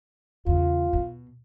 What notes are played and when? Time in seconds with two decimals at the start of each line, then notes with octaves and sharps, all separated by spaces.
0.46 E2 C#3 F4
0.93 B2